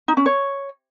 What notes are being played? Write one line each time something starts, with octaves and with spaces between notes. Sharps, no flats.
D#4
C#4
C#5